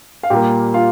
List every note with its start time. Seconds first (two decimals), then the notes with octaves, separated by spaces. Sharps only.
0.23 F5
0.30 A#2 G3 A#3 G4 G5
0.74 F4 F5